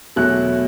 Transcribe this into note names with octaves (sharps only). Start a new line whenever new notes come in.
E2 B2 F#3 A3 F#6